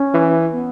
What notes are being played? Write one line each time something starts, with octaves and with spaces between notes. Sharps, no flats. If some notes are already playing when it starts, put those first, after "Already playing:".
Already playing: C#4
E3
B3